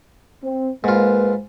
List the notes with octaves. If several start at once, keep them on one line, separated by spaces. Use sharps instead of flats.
C4
G#2 A#3 F4 B4